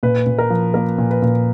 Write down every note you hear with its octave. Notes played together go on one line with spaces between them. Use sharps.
A#2 B4
A#2
A#4
F3
A#3 A#4
A#2
B4
A#2